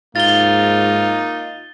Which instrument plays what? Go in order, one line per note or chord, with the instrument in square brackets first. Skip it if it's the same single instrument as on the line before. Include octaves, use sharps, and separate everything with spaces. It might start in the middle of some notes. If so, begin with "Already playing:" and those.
[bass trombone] G#2 [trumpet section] A#3 D#4 [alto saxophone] F4 [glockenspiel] A6 G7